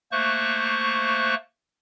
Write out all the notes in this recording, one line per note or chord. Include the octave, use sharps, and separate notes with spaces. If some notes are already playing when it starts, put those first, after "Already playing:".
A3 A#3 C5 C#6 F#6